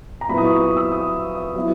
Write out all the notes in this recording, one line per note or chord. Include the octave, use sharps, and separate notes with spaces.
A#5
A#2 F#3 B3 E4 B5
D#6
C#6
D#6
E6
D#6
D#6
F#3 B3 E4